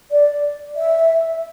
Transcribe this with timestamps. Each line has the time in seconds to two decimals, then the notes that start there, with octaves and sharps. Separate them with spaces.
0.12 D5
0.76 E5